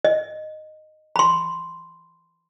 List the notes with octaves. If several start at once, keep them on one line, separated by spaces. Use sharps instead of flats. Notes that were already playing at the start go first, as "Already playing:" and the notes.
D#5
B5 C6